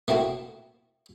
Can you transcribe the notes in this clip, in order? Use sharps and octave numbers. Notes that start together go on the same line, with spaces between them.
A3 A#3 C4 E4 F#4